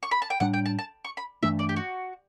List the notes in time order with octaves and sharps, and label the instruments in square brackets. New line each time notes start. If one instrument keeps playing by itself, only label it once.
[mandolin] C#6
B5
A5
G5
[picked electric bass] A2 G3 D4 [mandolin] F#5
[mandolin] G5
A5
A5
C#6
B5
[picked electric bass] G2 E3 A3 D4 [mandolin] E5
[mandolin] D5
G4
F#4